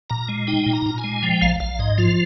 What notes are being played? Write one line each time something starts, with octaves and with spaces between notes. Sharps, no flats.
A#2 A#5
G#3
D#4 G5
A#2
A#5
A#2
G#5
G#3
F3 G5
A#1 F5
A#1 F5
G#2 D#5
F3 F4